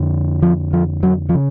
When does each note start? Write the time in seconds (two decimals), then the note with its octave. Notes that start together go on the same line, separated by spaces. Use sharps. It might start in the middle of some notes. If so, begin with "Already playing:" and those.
Already playing: F2 D3
0.42 F3
0.73 F3
1.03 F#3
1.29 F3
1.35 C#3